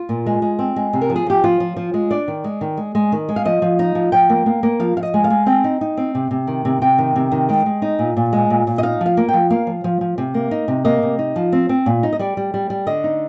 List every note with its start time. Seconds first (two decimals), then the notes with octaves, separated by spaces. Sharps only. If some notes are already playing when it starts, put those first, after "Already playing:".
Already playing: F4
0.09 A#2
0.26 G#3
0.42 G#3
0.59 C4
0.76 G#3
0.93 C3
1.01 A#4
1.10 F3
1.16 G#4
1.26 F3 G4
1.44 F3 F4
1.60 F3
1.76 F3
1.94 G#3
2.11 D4 D5
2.28 D#3
2.44 G#3
2.61 D#3
2.77 G#3
2.95 G#3
3.12 D#3
3.29 G#3
3.36 F5
3.45 F3 D#5
3.62 F3
3.79 D#4
3.95 F3
4.12 F3 G5
4.30 A#3
4.46 A#3
4.63 A#3
4.80 F3 F5
4.97 F3 F5
5.03 D#5
5.14 G#3
5.24 F5
5.30 G#3
5.46 C4 G5
5.64 D#4
5.81 D#4
5.97 C4
6.15 C3
6.31 C3
6.47 D#3
6.65 C3
6.82 C3 G5
6.98 D#3
7.16 C3
7.32 D#3
7.49 G#3 G5
7.66 G#3
7.82 D#4
7.99 A#2
8.17 A#2
8.33 G#3
8.50 A#2
8.67 A#2
8.78 D#5
8.83 D#4 F5
9.01 F3
9.06 F5
9.17 A#3
9.29 G5
9.34 F3
9.50 A#3 F5
9.67 F3
9.84 F3
10.01 F3
10.18 C3
10.34 A#3
10.51 D#4
10.68 C3
10.85 A#3 D#5
11.03 C3
11.19 D#4
11.36 F3
11.52 C4
11.69 C4
11.86 A#2
12.03 D#4
12.13 D#5
12.19 G3 D5
12.37 G3
12.54 G3
12.70 G3
12.87 D3 D#5
13.04 D#4